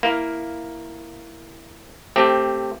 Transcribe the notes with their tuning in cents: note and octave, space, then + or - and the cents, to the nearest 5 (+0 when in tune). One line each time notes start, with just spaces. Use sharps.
A#3 +0 E4 +5 F5 +0
A3 +20 C4 +10 G4 +0